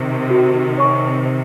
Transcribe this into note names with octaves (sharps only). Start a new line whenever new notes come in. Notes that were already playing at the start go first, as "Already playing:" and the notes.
Already playing: C3 D#3
F#4
C#5 G#5 C#6
C5